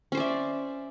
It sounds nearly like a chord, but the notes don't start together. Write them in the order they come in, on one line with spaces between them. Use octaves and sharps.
C#4 C5 D5 E5